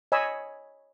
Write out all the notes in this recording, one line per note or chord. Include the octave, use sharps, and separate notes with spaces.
C#5 D#5 G#5 B5 E6